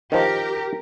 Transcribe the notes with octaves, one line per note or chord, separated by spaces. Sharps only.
D#3 F3 G4 A#4